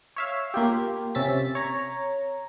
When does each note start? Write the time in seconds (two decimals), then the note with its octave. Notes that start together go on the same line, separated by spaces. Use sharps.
0.16 C#5 E5 F5
0.54 A#3 F4 G4
1.15 C3 C#4 E5 A6 B6
1.55 C#5 A#5